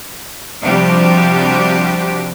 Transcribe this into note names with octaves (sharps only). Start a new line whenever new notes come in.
C3 F3 G3 D4 F#4 G4